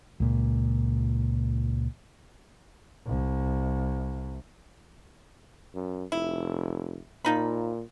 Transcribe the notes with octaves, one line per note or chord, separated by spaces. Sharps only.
C#2 A#2
C2
F#2
F1 E4
A#2 F3 D#4 B5